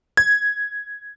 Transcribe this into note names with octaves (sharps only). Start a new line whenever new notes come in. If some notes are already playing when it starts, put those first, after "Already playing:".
G#6